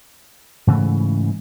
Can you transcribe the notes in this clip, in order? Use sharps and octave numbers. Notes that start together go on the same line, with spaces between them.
G#2 C#3 E3 A3